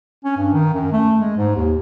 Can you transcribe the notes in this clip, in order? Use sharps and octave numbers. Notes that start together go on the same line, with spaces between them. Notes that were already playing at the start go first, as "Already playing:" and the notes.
C#4
G2
D#3
F#2
A3
G#3
G#2
D#2